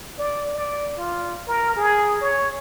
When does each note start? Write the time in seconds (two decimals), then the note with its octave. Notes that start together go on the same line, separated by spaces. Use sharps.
0.18 D5
0.55 D5
0.98 F4
1.48 A#4
1.76 G#4
2.21 C#5